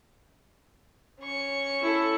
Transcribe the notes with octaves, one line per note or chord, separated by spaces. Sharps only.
C#4 C#6
E4 A4